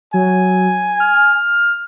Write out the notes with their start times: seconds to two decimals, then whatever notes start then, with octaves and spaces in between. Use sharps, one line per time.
0.14 F#3 G#5
1.00 F6